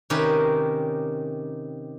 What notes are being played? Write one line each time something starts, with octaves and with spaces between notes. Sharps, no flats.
C3 D#3 C#4 G4 A#4 B4